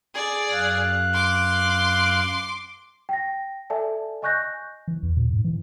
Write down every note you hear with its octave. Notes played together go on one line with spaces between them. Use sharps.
G#4 D5
F#2 F5 F#6
C6 D6
G5 A#6
A4 D5 E5 G#5 A5
D#5 G#5 C#6 F#6 G6 A#6
E3
E2
A#2
G#2
E3